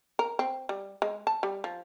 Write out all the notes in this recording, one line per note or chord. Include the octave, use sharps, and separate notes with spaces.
A#4
C4
G3
G#3
A5
G3
F3